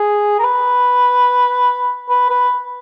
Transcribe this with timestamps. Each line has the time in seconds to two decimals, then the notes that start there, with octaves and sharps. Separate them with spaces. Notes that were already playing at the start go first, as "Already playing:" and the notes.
Already playing: G#4
0.39 A#4
0.44 B4
2.10 B4
2.30 B4